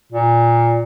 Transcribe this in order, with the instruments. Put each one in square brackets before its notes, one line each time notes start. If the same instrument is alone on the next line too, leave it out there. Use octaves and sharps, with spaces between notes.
[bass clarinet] A#2